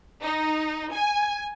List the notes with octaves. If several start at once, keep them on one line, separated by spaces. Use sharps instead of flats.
D#4
G#5